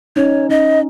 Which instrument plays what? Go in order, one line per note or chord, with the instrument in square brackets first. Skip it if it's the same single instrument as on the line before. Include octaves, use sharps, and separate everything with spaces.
[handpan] C#4 D#4 [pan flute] C#5
[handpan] C#4 D#4 [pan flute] D#5